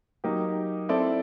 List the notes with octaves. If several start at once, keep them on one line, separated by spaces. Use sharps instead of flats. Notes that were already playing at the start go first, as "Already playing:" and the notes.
F#3 A#3 D#4 G4
C4 E4 A4 D5